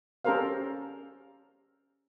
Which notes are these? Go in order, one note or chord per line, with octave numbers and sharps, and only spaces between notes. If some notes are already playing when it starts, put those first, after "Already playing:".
C#4 G4 A4 A#4 C5 F5